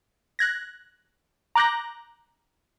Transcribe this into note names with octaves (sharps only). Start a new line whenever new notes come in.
F#6 G#6 A#6
A#5 D6 F#6 G6 A#6